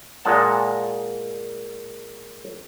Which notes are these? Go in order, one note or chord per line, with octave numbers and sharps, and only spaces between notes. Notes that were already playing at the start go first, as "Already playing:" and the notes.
A#2 G#3 D#5 F#5 A5